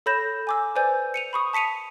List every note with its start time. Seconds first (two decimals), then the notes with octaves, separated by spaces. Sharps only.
0.06 A4 C#5 B5 G6 A#6 E7
0.47 G#5 D6 E6
0.75 B4 C5 D5 G#5 G6
1.14 C#7 D#7 F7
1.33 B5 C#6 D#6
1.53 A5 B6 C#7 D#7 F7